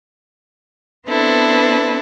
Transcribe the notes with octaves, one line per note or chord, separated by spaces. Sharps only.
B3 C4 D4 E4 A4 B4